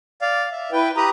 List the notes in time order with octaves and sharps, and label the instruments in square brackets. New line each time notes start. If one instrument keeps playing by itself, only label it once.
[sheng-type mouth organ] D5 F5
E5
[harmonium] E4 B4 [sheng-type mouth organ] G5
[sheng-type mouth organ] G4 B4 D#6 [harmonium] A#5